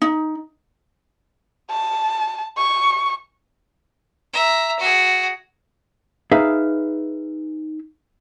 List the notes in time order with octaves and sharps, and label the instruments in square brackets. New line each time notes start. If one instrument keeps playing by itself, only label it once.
[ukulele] D#4
[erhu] A5
C#6
[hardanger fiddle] E5 A#5
F#4 G#4
[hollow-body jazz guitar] D#4 G#4 B4 E5 F5